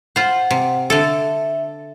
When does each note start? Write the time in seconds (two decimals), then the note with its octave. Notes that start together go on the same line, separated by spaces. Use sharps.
0.16 F4 C5 F#5
0.51 C3
0.90 D3 A4 E5